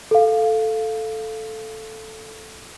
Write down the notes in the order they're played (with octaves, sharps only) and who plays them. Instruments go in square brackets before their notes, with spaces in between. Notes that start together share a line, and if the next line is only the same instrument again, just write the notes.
[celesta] A4 F5